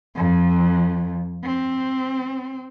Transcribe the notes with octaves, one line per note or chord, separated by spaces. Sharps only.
F2
C4